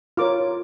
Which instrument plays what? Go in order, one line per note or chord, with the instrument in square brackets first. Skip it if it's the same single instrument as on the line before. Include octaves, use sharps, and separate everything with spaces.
[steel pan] F4 A#4 C#5 D6